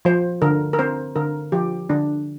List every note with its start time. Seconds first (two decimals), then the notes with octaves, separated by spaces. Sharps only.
0.05 F3 C5
0.42 D3 A#4
0.73 A#4
0.79 C4 C5
1.16 D3 A#4
1.52 F3 G4
1.90 D3 D4